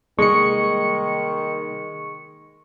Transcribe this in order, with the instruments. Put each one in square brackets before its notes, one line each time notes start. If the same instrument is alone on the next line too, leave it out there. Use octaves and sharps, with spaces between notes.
[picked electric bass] C3 G3 A#3 [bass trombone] D#3 [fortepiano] G#3 [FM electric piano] C#6 C#7